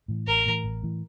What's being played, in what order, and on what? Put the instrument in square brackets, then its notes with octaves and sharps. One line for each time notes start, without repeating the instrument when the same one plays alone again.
[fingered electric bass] A2 E3
[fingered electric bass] A1 [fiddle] A#4
[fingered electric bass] A2 E3
A1
A2 E3